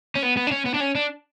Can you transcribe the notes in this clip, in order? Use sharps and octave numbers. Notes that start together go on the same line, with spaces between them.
C#4
B3
B3
D4
C#4
B3
D4
C#4
D4